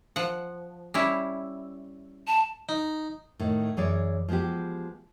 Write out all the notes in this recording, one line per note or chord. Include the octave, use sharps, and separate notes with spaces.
F3 F#5
G3 C#4 E4
A5
D#4
A2 D#3
F#2 E3 G#4 C#5 D5
F3 G#3 B3 F#4 G4